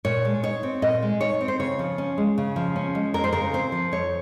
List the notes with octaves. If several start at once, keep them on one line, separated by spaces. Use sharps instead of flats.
A#2 C#5
G#3
D#4 C#5
C4
A#2 D#5
G#3
D#4 C#5
C4
C5
C#3 C#5
F3
C#4
G#3
C#3
F3
C#4
G#3
F2 A#4
C5
C#3 A#4
C4 C5
F3
F2 C#5